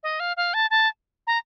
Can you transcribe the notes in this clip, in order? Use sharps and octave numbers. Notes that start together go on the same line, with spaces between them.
D#5
F5
F5
A5
A5
A#5